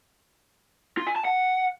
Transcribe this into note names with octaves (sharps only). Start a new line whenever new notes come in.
F4
G#5
A5
F#5